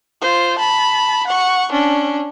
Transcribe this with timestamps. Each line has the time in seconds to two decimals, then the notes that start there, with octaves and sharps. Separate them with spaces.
0.21 F4 C5
0.58 A5 B5
1.27 F#5 C#6
1.72 C#4 D4